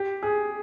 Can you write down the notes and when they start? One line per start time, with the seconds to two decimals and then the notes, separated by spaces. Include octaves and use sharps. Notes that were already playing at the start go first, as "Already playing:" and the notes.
Already playing: G4
0.23 G#4